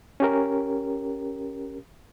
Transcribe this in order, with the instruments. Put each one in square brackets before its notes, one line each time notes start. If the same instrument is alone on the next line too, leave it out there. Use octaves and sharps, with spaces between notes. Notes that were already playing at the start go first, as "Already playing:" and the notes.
[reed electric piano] C#4 G4 A#4